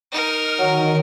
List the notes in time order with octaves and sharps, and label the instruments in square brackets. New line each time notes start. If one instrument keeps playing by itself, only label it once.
[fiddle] D#4 A#4 [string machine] F6
[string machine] D#3 [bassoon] F#3